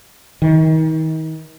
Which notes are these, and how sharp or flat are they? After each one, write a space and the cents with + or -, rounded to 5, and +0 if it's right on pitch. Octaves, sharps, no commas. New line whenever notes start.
D#3 +35